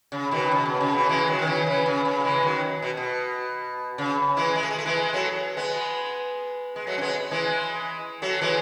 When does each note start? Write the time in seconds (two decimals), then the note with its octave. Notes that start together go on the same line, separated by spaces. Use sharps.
0.12 C#3
0.31 B2 D#3
0.51 C#3
0.66 B2
0.80 C#3
0.94 B2
1.04 A3
1.09 E3 G#3
1.27 D#3 F#3
1.39 D#3
1.47 C#3 E3
1.67 C#3 E3
1.86 C#3
2.05 C#3
2.20 F#3
2.24 E3 G#3
2.43 D#3 F#3
2.82 B2
2.97 B2
3.98 C#3
4.37 E3 G#3
4.56 G#3
4.63 A3
4.71 G#3
4.78 A3
4.85 E3 G#3
5.13 F#3 A3
5.57 G#3 B3
6.76 G#3
6.87 F#3 A3
6.98 C#4
7.01 G#3 B3
7.31 E3 G#3
8.22 F#3 A3
8.41 E3 G#3